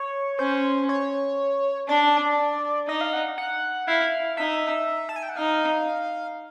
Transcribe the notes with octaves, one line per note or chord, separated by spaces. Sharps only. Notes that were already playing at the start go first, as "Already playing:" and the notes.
Already playing: C#5
C#4 C5
C#5
D4 D5
D#4 D#5
F5
F#5
F#5
E4 F5
D#4 E5
A5
G#5
G5
F#5
D#4 F5